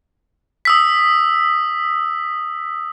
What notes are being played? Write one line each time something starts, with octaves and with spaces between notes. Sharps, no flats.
D#6 E6 B6